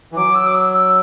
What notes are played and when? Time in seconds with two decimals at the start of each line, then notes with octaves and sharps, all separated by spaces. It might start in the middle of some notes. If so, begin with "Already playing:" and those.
0.12 E3
0.16 F#3 D6
0.35 E6
0.47 D6
0.55 E6
0.73 E6